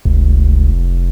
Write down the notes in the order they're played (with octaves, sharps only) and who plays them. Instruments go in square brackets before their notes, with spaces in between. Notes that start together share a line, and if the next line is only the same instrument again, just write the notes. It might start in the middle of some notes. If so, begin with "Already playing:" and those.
[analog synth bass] F1 [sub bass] C#2